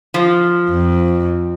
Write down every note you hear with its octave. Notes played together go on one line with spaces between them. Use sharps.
F3
F2